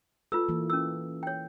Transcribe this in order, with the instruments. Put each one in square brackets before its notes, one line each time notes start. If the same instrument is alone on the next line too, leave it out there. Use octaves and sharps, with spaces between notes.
[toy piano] F4 B4 E6 [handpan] A4
[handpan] E3 A#3
[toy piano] C#4 E6
C#5 G5